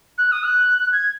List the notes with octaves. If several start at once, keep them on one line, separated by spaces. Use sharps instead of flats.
F#6
D#6
F#6
G#6